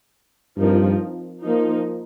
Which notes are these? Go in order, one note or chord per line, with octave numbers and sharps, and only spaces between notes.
G2 F3 C4 D#4 A#4
F3 A#3 D#4